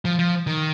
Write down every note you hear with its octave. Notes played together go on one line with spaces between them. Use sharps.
F3
F3
D#3